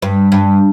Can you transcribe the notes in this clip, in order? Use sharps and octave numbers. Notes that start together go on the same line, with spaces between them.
G2
G2